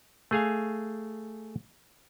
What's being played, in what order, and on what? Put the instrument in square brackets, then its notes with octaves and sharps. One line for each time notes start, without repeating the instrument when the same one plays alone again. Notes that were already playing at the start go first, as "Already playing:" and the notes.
[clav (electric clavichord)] A3 G#4 F5 G#5